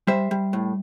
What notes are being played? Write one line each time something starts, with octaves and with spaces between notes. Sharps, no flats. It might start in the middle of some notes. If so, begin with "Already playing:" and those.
G3 C5 E5
G3
A2